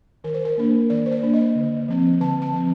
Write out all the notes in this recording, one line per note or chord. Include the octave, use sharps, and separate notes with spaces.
D#3 A#4
C5
A#4
A#3 D4
D#3 D5
C5
D5
A#3 D4
D#5
D3
F3 C4
D3 A5
A5
F3 C4